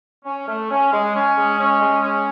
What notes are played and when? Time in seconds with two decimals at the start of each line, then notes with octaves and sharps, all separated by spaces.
0.25 C#4
0.47 A3
0.70 C#4
0.91 G#3
1.14 C#4
1.36 G#3
1.59 C#4
1.81 G#3
2.03 C#4